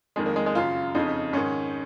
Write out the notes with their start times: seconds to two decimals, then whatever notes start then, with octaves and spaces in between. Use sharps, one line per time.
0.16 F2 D#3 G#3
0.26 A#3
0.36 G#3
0.46 G#3
0.55 F#2 C#3 F4
0.95 F2 C#3 D#4
1.33 G#2 D#3 C#4